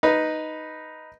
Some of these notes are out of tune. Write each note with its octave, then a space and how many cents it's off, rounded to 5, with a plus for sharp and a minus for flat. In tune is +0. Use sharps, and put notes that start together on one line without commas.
D#4 +0 B4 +0